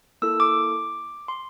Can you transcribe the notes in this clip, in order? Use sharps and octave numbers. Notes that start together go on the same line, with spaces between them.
A#3 E4 A4 E6
D6
C6